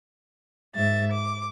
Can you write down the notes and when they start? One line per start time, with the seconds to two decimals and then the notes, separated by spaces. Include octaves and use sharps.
0.75 G#2 E5 A6
1.12 D6